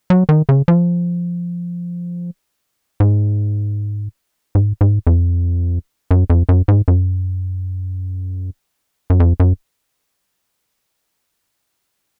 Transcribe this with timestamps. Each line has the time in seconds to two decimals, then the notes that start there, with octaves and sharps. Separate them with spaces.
0.10 F#3
0.29 D#3
0.49 C#3
0.68 F3
3.00 G#2
4.55 G#2
4.81 G#2
5.07 F2
6.11 F#2
6.30 F2
6.49 F#2
6.68 G#2
6.88 F#2
9.10 F#2
9.20 F2
9.40 F#2